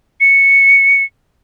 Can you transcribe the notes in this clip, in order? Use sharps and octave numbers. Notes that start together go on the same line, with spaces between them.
C#7